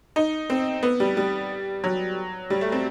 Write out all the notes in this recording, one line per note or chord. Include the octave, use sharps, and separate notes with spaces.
D#4
C4
B3
G3
G3
F#3
G3
A3
C4